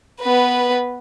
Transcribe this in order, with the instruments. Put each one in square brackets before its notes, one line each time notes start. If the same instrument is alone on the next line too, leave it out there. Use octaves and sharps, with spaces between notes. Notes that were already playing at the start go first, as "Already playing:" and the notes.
[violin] B3 B4